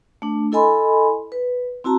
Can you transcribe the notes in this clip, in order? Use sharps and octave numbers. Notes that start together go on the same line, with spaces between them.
A3 D4
E4 A4 D#5 G#5 B5 C6
B4
C4 E4 F#4 A5 A#5